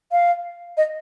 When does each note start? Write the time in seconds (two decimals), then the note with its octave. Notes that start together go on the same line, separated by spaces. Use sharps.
0.12 F5
0.77 D#5